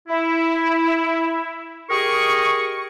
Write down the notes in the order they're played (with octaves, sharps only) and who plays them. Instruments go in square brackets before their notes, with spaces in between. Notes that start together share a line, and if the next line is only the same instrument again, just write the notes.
[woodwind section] E4
G4 G#4 A#4 D#5 C#6